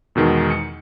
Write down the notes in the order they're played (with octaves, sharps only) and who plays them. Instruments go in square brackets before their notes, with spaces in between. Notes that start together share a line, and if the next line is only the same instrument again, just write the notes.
[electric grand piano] E2 B2 D#3 G#3
C#7